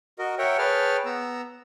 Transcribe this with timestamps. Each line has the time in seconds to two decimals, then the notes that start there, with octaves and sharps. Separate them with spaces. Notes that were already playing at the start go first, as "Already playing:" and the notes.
0.19 F#4 A#4 D#5
0.38 A#4 C#5 E5 F#5 G5
0.58 G#4 B4 C#5 G5 A5 F6
1.05 B3 A#5 E6